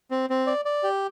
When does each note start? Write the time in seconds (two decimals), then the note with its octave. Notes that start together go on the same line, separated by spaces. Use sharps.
0.11 C4
0.30 C4
0.47 D5
0.65 D5
0.83 G4